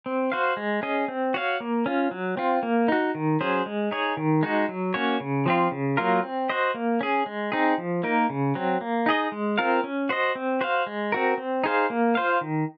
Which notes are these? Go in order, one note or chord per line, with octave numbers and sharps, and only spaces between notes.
C4
F#4 C5 F5
G#3
C#4 G#4 D#5
C4
F#4 C#5 F5
A#3
C#4 F4
F#3
C4 F4
A#3
D#4 F#4
D#3
F#3 C#4 G#4 C5
G#3
D#4 G#4 C#5
D#3
G#3 D#4 F#4
F#3
A#3 C#4 F#4 C#5
C#3
F3 C4 F4
C#3
F#3 A#3 F4 A#4
C4
F#4 C5 D#5
A#3
C#4 G#4
G#3
C4 D#4 G#4
F3
A#3 D#4 A#4
C#3
F#3 C4
A#3
D#4 G#4 D#5
G#3
C4 F4 A#4 F5
C#4
F#4 C5 D#5
C4
F#4 C5 F5
G#3
C4 F#4 A#4
C4
D#4 G#4 C5 F5
A#3
F4 C5 F5
D#3